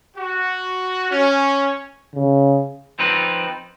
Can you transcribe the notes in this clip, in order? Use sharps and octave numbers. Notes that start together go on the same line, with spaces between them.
F#4
C#4
C#3
F3 C4 D#4 B4